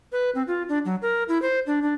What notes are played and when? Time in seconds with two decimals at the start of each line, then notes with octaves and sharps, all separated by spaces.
0.12 B4
0.35 C4
0.47 F4
0.69 D4
0.85 F#3
1.02 A#4
1.28 E4
1.42 C5
1.66 D4
1.82 D4